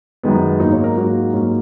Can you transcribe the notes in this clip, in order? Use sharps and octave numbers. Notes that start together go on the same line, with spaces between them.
F#2 D#3 G#3 B3
G#2 F#3 A#3 D#4
C#5
A#4
G#2 F#3 A#3 F#4
G#2 F#3 A#3 C#4